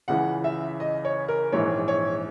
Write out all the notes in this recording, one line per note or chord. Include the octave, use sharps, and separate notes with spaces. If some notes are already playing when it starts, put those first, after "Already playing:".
C#2 C#3 E3 F#5
E5
D#5
C#5
A#4
A#1 G#2 E3 C#5
C#5